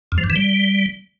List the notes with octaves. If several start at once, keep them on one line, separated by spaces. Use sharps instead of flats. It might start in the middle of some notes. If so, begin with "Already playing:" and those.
F2
F3
G2
E3
G3